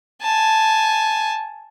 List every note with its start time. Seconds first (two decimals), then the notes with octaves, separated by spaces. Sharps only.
0.22 G#5 A5